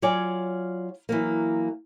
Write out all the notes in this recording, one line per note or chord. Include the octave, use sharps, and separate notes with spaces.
F#3 F4 C#5 D5 G#5
E3 F#3 A#3